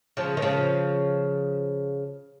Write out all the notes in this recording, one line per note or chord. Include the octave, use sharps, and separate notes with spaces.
C#3 F3
D#3
C#3 F3